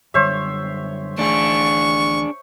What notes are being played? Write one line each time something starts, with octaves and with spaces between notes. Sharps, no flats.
F#2 D3 G3 C5 C#5 E5
D2 E3 A3 D4 G#4 C#6